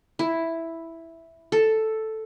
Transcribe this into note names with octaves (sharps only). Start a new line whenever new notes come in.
E4
A4